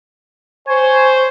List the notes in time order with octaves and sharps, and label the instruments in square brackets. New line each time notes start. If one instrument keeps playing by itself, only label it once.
[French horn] C5 [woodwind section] C#5 G#5 C#6